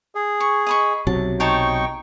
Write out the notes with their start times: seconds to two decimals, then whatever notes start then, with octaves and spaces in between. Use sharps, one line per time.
0.15 G#4
0.40 C#6
0.67 D#5 B5 C#6
1.07 B1 C3 F#3 A5
1.40 D#4 C5 C#5 G5 A5 C#6